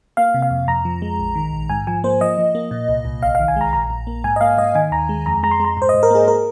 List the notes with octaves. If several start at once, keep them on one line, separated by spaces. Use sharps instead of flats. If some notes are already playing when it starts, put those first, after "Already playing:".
A#3 F5
C3
F5
F2
F2 A#5
F3
G#3
A#1
D#3
A#1
G#2 G#5
F3 G#5
A#3 C5
F3 D#5
F3
A#3
A#2
C2
C2
A#1 F5
D#3 F5
G#5
G#3 A#5
A#1 A#5
A#1
A#3
G#2 G#5
D#5
A#3 F5
G#2 D#5
D#3 G#5
D#2 A#5
G#3
F2 A#5
G#3 A#5
C6
G#3 A#5
G#2 C5
D#5
G#2
A#4
A#3 G#4
A#4